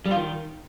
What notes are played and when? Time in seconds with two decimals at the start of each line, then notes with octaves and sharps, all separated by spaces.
0.06 G3
0.11 F4
0.16 D#3